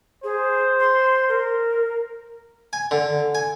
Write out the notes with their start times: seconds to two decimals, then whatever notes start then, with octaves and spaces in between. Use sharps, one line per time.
0.24 G#4 C5
0.80 C6
1.29 A#4
2.73 G#5
2.91 D3
3.35 G#5